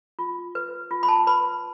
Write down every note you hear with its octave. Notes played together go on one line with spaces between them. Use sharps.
F4
B4
F4
B5
A5
B4 B5